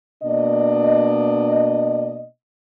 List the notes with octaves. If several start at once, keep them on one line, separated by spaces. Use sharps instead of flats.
B2 A#3 D4 D5 D#5